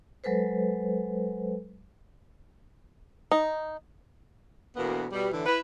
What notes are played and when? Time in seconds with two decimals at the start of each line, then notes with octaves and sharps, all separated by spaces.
0.24 F#3 G#3 A4 B4 C5
3.31 D#4
4.76 D2 B2 E3 A#3 B3
5.12 B2 G3
5.32 A2 D3 E3
5.46 E4 B4